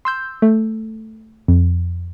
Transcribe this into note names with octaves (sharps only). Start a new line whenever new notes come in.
C6 E6 G6
A3
F2